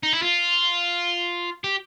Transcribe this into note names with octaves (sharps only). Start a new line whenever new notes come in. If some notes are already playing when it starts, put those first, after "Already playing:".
D#4
E4
F4
G4